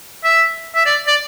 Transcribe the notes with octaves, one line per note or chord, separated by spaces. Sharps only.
E5
E5
D5
D5